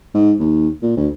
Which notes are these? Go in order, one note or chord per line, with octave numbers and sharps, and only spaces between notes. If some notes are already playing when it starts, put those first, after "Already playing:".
G#2
D#2
A#2
D2